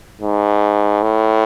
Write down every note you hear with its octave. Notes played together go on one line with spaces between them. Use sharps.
G#2
A2